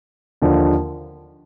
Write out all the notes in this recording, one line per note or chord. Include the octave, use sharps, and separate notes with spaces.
D#2 D3 F3